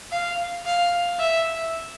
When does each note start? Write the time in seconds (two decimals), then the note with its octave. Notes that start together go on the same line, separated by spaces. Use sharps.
0.12 F5
0.66 F5
1.20 E5